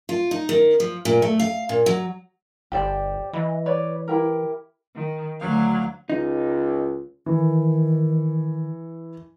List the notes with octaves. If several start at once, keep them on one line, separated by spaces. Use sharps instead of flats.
F4
D#4
D#3
F3
A#2
A3
F5
A#2
F#3
G1 G4 C5 D5
E3 D#5 B5
B4 C#5 D5
E4 G4 A#4
D#3
D2 F#3 F5
C#2 D#4
D#3 E3